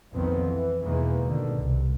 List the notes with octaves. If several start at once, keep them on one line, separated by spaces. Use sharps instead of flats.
A#1 F2 A#2 D#3 B3 C4
E3
E2 B2 D#3 E3 G#3 A#3
G#1 B2 D3 D#3
C2